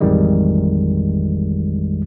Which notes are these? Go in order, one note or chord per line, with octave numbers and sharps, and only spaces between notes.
A1 F2 D#3 G3 G#3